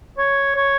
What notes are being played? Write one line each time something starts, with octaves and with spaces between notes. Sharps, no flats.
C#5
C#5